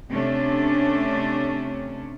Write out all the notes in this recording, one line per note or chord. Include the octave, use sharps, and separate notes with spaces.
C3 A3 C#4 D4